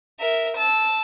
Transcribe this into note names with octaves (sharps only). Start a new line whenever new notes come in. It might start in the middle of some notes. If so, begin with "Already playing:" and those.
A#4 E5
A5 E6